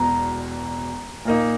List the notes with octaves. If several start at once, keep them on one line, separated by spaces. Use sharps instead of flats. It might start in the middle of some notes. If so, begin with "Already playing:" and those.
Already playing: E1 E2 B2 A#5
A#2 A#3 D#4